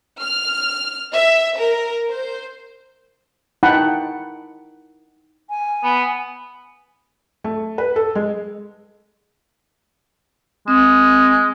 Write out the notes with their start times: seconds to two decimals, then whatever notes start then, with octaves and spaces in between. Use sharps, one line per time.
0.21 F6
1.13 E5
1.58 A#4
2.09 C5
3.63 D#4 E4 F#5 G5 A5 B5
5.50 G#5
5.84 B3
7.44 A3
7.78 B4
7.96 A4
8.15 G#3
10.68 G#3 C4